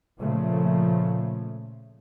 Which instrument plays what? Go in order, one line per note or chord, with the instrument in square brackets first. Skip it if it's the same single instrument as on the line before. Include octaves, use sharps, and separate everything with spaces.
[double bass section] A#2 C#3 F3 A3